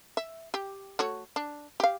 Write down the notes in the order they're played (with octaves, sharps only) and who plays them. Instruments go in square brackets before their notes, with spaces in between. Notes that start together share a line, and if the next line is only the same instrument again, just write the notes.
[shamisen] E5
G4
A3 F#4 C#5
D4
G4 F5